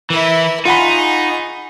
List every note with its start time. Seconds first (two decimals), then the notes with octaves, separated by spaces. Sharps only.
0.10 E3 E4 A#4
0.65 D#4 F4 G#4 F#5 B5 C#6